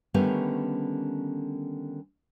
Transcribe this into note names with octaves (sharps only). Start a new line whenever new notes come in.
D3 D#3 G3 A3 B3 C#4